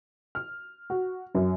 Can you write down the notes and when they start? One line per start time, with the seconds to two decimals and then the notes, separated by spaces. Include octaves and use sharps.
0.35 F6
0.90 F#4
1.35 F#2